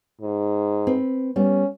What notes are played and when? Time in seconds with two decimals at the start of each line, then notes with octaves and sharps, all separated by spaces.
0.21 G#2
0.87 C4 B4
1.36 G3 B3 C#4